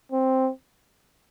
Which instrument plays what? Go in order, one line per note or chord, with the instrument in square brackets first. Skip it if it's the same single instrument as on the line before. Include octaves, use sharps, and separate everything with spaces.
[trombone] C4